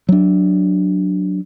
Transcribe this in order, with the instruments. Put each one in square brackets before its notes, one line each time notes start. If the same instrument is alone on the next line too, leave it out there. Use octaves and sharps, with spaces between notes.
[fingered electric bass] F#3 D4